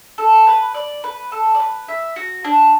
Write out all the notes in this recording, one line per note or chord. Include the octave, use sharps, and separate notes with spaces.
A4
B4
D5
B4
A4
D5
B4
E5
F#4
D4